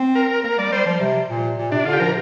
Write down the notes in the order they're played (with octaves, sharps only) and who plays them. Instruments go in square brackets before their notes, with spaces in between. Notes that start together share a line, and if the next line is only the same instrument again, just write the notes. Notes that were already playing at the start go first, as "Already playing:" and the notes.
Already playing: [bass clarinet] C4
[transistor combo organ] A#4
[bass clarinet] A#3 [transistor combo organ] A#4
[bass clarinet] G3 [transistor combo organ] D5
[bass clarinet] G3 [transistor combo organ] C5
[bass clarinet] F3
C3
A#2
A#2
[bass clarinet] C3 [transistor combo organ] D4
[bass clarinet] D3 [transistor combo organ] F4
[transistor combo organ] G4
[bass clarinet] F3 [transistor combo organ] A#4